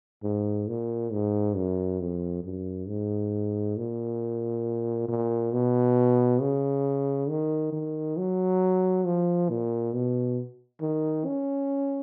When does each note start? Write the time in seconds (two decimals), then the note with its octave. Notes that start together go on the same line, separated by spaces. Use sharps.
0.23 G#2
0.68 A#2
1.12 G#2
1.56 F#2
2.00 F2
2.44 F#2
2.88 G#2
3.77 A#2
5.08 A#2
5.53 B2
6.41 C#3
7.29 D#3
7.73 D#3
8.17 F#3
9.06 F3
9.49 A#2
9.94 B2
10.81 D#3
11.26 C#4